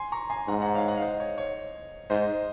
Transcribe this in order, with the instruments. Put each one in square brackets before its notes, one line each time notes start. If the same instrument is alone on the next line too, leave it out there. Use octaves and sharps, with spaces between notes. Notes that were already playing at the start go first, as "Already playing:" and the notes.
Already playing: [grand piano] G#5 C6
A#5 C#6
G#5 C6
[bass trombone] G#2 [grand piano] F#5 A#5
[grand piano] F#5 A#5
C#5 F5
D#5 F#5
F5
C5 D#5
C#5
C#5
[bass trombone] G#2 [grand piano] C5 D#5